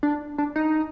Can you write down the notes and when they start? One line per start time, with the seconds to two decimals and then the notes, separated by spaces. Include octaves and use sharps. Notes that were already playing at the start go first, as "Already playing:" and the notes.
0.03 D4
0.38 D4
0.56 D#4